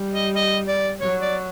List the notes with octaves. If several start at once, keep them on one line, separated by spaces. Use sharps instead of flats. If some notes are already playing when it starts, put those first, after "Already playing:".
Already playing: G3
D#5
D#5
D5
F#3 C#5
D5